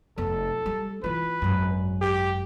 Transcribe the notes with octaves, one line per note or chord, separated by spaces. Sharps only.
F1 B3 A4
G3
E3 F4 B4
G#1 F#2
G4